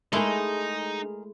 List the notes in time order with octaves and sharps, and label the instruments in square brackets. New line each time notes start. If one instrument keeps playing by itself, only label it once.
[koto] G#3 A3 E4 [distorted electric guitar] D#4 [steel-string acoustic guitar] G#4 A#4 D#5